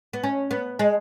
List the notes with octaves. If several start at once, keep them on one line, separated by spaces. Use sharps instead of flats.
B3
C#4
B3
G#3